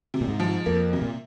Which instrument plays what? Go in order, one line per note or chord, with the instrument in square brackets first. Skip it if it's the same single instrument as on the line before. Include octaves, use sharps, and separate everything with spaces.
[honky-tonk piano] C3
[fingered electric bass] A#2
G#2
[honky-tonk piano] F3
[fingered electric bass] F2 [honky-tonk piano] A#3
[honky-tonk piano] C3
[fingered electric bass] A#2